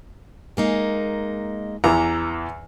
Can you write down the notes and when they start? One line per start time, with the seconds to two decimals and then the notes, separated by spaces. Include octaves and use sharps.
0.57 G#3 A#3 D#4
1.84 E2 E3 A#5